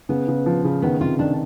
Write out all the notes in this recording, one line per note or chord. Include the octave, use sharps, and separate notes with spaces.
C#3 B3
C#3
F3
C#3
D#3 B3
C3 F4
D#3 D4